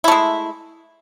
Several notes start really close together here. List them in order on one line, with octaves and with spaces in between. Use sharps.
E4 A3 G#3